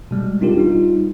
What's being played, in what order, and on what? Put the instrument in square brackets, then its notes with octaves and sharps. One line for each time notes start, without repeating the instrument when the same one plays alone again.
[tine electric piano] B2 G3 G#3
C4 D4 D#4 F4 G4 A#4
G3 D#4 F4